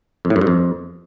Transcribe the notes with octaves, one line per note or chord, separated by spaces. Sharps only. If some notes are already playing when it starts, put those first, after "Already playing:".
F2
A2
F#2
G2
F2